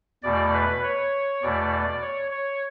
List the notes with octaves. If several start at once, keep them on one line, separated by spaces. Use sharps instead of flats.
E2 B2 A3 D5
B4
C#5
E2 B2 A3 D5
D5
C#5
C#5